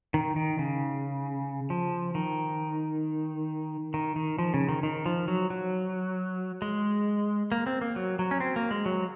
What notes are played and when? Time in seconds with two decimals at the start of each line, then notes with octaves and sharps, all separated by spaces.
0.14 D#3
0.36 D#3
0.59 C#3
1.70 F3
2.15 D#3
3.94 D#3
4.16 D#3
4.39 F3
4.54 C#3
4.69 D#3
4.83 D#3
5.06 F3
5.28 F#3
5.50 F#3
6.62 G#3
7.52 A#3
7.66 C4
7.81 A#3
7.96 F#3
8.19 F#3
8.31 C#4
8.40 C4
8.56 A#3
8.71 G#3
8.86 F#3